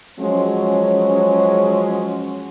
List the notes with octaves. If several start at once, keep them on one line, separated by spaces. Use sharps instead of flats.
F3 F#3 G#3 C#4